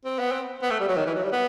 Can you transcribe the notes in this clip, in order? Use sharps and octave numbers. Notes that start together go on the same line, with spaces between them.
C4
B3
C4
B3
A3
G3
F#3
D#3
E3
F#3
G3
B3